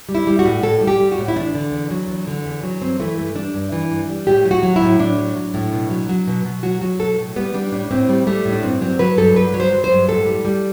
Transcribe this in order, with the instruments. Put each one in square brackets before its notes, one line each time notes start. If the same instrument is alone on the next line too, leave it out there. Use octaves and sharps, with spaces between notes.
[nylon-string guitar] G3
E4
G3
F#4
A2
A2 A4
G3
G4
G3
F#4
A2
E4
E2 D4
D3
E2
F#3
E2
D3
E2
F#3
G2 C4
E3 A3
G2 A3
G3 D4
G2
E3
G2
G3
A2 G4
F#3
F#4
F#3
E4
A2
A2 D4
F#3
F#3
A2
B2
F#3
F#3
B2
B2
F#3 F#4
F#3 F#4
B2 A4
A2
G3 B3
G3 D4
A2 D4
A2 C4
G3
G3 A3
A2
D4
G2 C4
F#3 C4
F#3 B4
G2 A4
G2 B4
F#3
C5
F#3
C5
G2
A2 A4
G3
G3